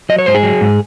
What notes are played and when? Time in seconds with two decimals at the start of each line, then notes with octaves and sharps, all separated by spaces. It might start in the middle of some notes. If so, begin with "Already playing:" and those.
0.09 F#3 D#5
0.19 C#5
0.26 G#2 C5
0.35 G#4
0.43 F#3
0.61 G#2